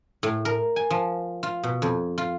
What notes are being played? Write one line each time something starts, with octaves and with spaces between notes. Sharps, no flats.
A2
A#4
G#5
F3
F4
B2
F2
F4